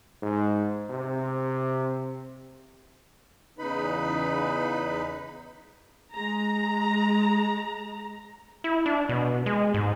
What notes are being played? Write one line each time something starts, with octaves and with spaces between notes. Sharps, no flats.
G#2
C3
E2 C#3 D#4 B4 B5
G#3 A#5
E4
D4
B2
G#3
G#2